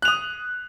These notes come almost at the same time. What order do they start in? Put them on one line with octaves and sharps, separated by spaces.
F#6 F7 D#6